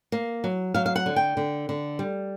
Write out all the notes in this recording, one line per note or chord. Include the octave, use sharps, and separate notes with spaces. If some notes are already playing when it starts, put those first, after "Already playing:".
A#3
F#3
F#3 F5
F5
F#5
D3
G5
D3
D3
G3